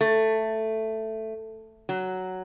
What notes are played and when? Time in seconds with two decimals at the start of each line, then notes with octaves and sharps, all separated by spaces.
0.01 A3
1.89 F#3